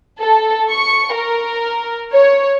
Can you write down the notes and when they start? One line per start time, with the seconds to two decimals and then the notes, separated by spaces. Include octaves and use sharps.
0.20 A4
0.71 C#6
1.14 A#4
2.12 C#5